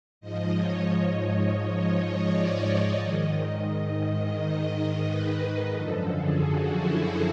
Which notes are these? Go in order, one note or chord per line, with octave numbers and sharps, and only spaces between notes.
G#2 F3 D#5
C#5
D5
D#5
G#2 D#3 D#5
D#5
B4
F#2 D3 F3 A4
G#4
F#4
E4